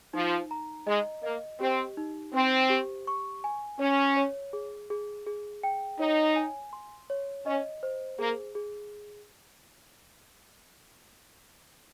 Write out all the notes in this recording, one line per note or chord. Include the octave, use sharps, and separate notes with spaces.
F3 D#4
A#5
G#3 D#5
A#3 D#5
C4 G4
D#4
C4 C5
G4
C#6
G#5
C#4 C#5
C#5
G#4
G#4
G#4
G5
D#4 C#5
G#5
C6
C#5
C#4 D#5
C5
A#3 G#4
G#4